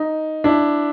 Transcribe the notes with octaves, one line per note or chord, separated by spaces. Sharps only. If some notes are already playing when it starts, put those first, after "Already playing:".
Already playing: D#4
D4 E4